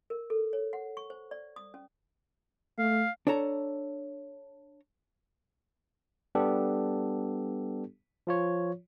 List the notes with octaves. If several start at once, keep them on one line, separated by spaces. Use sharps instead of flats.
A#4
A4
C#5
F#5
C#6
C5
D5
D#6
C#4
A3 F5
D4 A4 C#5 A5 A#5
G3 B3 D4 G4 A4
F3 F4 C#5